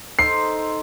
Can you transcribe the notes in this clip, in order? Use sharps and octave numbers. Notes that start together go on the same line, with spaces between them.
D#4 A4 C5 C7